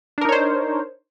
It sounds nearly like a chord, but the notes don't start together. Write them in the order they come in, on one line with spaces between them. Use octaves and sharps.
D4 A#4 D#4 C#5 C5